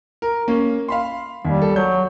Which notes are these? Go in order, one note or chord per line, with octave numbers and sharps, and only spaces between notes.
A#4
A#3 C#4
F5 B5 C6
D#2 G3
A4
F#3 G6